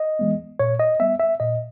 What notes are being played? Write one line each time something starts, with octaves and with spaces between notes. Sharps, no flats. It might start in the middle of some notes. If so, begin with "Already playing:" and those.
Already playing: D#5
E3 G#3 B3
A#2 C#5
D#5
G3 B3 E5
E5
A#2 D#5